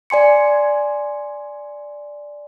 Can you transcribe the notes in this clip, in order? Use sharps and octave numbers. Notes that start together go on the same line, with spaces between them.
D5 G#5 C6 C#7